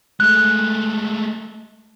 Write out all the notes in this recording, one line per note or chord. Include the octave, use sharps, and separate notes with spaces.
G#3 A3 F#6